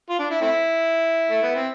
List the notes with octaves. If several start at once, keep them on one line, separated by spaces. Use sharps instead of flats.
F4
D4
E4
A3 C4 E4
A3
B3
C4